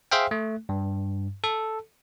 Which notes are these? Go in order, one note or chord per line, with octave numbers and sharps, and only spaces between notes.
G#4 C5 E5 F5 G5
A3
G2
A4